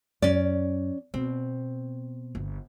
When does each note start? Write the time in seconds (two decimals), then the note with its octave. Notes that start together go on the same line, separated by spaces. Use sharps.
0.22 F#2 F#3 C#4 D5
1.14 B2 C4
2.35 G1